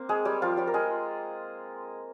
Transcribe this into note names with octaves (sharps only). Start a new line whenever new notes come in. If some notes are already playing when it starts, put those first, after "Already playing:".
Already playing: A#3 C4 C5
G#3 G#4
G3 G4
F3 F4
G3 G4
A#4
G#3 G#4